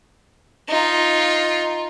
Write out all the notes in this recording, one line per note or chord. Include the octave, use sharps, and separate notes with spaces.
D#4 F4